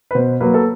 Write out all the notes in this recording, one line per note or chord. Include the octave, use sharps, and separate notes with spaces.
B4
B2 C5
F#3 A#3 B4
A4